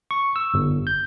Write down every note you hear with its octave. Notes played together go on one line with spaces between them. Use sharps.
C#6
E6
G1
G6